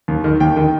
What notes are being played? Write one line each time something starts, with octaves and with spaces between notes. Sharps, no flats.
D#2
D#3
D#2 G5
D#3